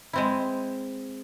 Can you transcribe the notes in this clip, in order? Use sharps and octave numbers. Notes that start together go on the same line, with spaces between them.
G#3 C4 E4